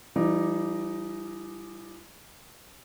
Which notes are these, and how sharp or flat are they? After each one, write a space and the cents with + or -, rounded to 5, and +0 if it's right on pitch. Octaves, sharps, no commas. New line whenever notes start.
E3 +40 G3 +0 D#4 +0